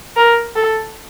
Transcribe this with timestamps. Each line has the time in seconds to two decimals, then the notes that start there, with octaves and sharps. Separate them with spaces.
0.16 A#4
0.55 A4